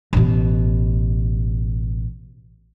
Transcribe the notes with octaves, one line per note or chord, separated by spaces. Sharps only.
A1 B2